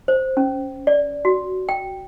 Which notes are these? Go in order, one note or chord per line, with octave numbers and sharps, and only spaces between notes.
C5
C#4
D5
F#4
G5